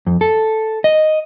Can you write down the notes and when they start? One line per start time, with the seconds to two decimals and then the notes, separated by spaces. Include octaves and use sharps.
0.07 F2
0.21 A4
0.84 D#5